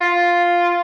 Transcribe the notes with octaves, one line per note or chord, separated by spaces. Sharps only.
F4